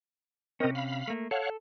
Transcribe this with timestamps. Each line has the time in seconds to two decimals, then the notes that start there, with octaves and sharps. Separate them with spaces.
0.60 C3 C4 C#4 A#4 D#5
0.75 F5 B5
1.08 A3 A#3
1.31 A4 C#5 F5 F#5